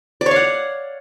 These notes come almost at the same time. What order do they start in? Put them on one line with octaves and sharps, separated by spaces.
D5 C#5 F5 F#5